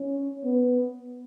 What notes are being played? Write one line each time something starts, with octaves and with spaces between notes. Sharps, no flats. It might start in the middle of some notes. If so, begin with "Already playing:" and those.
Already playing: C#4
B3